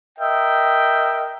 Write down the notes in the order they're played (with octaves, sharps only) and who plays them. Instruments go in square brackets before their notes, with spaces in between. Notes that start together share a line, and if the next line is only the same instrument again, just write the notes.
[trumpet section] A#4 D#5 E5 G5